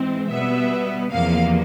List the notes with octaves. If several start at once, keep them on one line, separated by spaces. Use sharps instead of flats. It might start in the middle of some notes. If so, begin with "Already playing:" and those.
Already playing: G#2 E3 G#3 C4
B2 G3 B3 E5
E2 C3 F3 A#3 F5